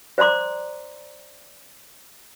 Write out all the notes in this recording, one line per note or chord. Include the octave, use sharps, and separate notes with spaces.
C5 D5 A#5 C6 D6